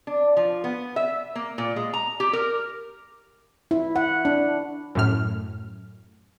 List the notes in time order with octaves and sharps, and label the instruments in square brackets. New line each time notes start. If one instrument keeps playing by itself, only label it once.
[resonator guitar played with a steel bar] D4
F3
B3
E5
A#3
A#2
G#3
A#5
G4
A#4
[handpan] E4
F#5
D4
[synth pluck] F#2 A2 F6